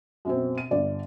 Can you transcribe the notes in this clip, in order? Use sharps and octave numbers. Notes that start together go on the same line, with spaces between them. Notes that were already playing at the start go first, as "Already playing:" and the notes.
F#2 B2 C4
D#7
G1 D5